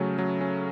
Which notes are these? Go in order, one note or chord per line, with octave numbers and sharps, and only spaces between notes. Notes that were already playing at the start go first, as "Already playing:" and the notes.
Already playing: C#3 F#3 A3 C#4
F#3
C#4